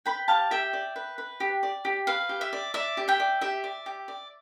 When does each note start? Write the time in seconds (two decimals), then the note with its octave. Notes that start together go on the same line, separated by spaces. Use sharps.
0.06 B4 G5 B5
0.28 G4 F5 A5
0.51 G4 E5 G5
0.73 D5
0.96 B4
1.18 B4
1.40 G4
1.63 D5
1.85 G4
2.07 B4 F5
2.29 G4
2.41 E5
2.53 D5
2.74 D5 E5
2.97 G4
3.08 E5 G5
3.20 D5
3.41 G4 E5
3.64 D5
3.86 G4
4.08 D5